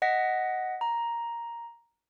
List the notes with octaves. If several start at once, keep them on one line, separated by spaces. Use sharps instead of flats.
D#5 F#5 A#6 B6
A#5